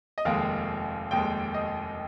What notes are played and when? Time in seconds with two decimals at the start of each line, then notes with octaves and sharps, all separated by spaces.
0.18 D#5
0.25 F1 D#2 D#3 G#3 F5
1.11 F1 D#2 D#3 G#3 G5
1.54 D#5